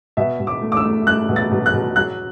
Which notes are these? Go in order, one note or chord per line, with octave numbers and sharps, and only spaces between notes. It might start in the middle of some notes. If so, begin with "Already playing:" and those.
B2 E5
B2
D6
A3
D6
E6
A3
A3 F#6
B2
A6
B2
F#6
B2
F#3 F#6